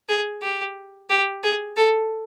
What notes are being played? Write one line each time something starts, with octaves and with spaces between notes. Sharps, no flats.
G#4
G4
G4
G#4
A4